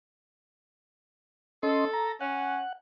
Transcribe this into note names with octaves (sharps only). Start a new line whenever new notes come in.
C#4 A4 D#5 C6
A#5
C#4 F#5